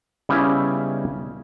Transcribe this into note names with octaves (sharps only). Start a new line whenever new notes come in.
C#3 G3 B3 C#4 D#4 E4